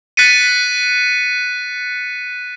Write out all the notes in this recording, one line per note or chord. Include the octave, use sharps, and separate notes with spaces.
F#6 A6 B6 C#7 D#7